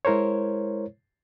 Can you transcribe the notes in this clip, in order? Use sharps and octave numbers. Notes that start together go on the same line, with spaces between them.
G#3 E4 A#4 C5 C#5